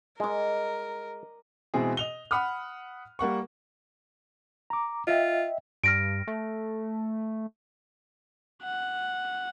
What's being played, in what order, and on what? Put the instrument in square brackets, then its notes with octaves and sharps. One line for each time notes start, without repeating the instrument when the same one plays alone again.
[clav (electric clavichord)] G#3 [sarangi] A#4 [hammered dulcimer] D#5 D6
[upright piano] B2 E3 G#3 C4 G#4
D#5 F7 G7
F#5 B5 D#6 F6
G3 A#3 F#5 C#6
[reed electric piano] A#5 D6
[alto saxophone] F4 [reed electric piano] D#5 E5 G5
[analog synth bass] G2 [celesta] F6 A#6 D7
[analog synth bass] A3
[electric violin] F#5